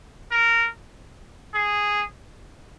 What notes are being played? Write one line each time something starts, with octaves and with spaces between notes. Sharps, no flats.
A#4
G#4